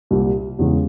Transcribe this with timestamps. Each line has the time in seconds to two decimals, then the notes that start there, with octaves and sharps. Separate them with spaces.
0.11 C2 A#2 G3
0.59 E2 C#3 E3 G#3